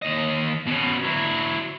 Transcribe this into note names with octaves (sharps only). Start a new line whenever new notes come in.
D#2 D#5
B2 C#4
F#3 E4